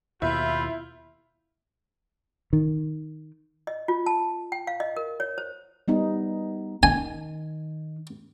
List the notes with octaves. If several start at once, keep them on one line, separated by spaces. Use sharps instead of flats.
D#2 B2 E4 F4 B5 G6
D#3
D#5
F4
A5
G5
F5
D#5
A#4
C#5
C5
G3 B3 D#4
D#3 G#5